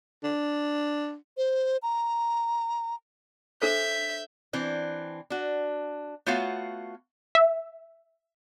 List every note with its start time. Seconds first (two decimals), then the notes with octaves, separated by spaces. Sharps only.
0.24 D4
1.37 C5
1.83 A#5
3.62 D4 A4 C5 E5 G6 B6
4.53 E3 C4 D4
5.30 D4 F#4
6.26 A3 B3 F4 F#4 C#5 F5
7.35 E5